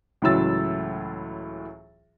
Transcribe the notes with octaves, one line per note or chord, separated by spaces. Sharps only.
C#2 A2 E3 F#3 E6 A6